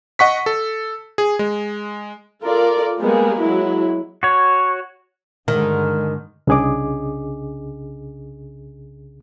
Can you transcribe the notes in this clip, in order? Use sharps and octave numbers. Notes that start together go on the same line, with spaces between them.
D#5 F#5 C#6 B6
A4
G#4
G#3
F4 A4 A#4 D5
G3 G#3 A#3 B3 G#4
F#3 G#3 E4
F#4 C#5
G2 D3 D#3 G#3
C2 C#3 D4 G#4 D#5 D6